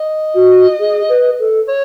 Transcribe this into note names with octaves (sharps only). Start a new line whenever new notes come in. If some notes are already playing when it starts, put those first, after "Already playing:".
Already playing: D#5
F#4
G#4
B4
A4
C#5